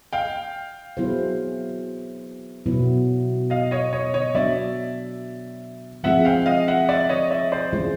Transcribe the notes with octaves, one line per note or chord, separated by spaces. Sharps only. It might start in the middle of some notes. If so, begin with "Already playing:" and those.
F5 G5
F#3 B3 E4 G#4 C5
B2 F#3 B3 E4
D#5 F5
C#5 D#5
C#5 D#5
C#5 D#5
F#3 B3 D4 D5 E5
F3 G#3 C4 F4 G#4 E5 F#5
F5 G5
D#5 F5
E5 F#5
D5 E5
C#5 D#5
D5 E5
C5 D5
E3 G#3 C#4 F4 G#4